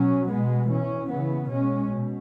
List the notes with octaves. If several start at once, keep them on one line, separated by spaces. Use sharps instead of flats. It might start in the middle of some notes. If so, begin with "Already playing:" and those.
Already playing: B2 F#3 C#4
B2 G#3 B3
E3 C#4
C#3 E3 B3
B2 G#3 C#4
B2